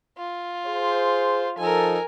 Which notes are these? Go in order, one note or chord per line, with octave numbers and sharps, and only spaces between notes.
F4
G#4 C5
F3 D#4 A4 A#4 G#5